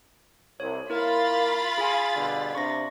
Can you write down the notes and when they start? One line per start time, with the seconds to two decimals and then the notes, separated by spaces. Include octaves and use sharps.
0.60 C2 C#5
0.90 A#3 E4 F4 A#4 B5 A6
1.78 G#4 F5 G#5
2.15 B2 D3 G3
2.55 C3 D4 C#6 A#6